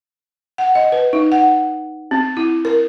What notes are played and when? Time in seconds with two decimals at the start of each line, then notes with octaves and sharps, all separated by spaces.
0.58 F#5
0.75 D#5
0.92 B4
1.13 D#4
1.32 F#5
2.11 C4
2.37 E4
2.65 A#4